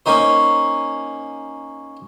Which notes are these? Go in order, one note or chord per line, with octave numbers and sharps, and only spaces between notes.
A#3 C#4 D#4 C5